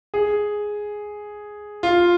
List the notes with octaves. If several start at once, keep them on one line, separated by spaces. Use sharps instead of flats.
G#4
F4